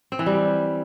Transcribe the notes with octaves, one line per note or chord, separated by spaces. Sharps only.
C4
E3
G3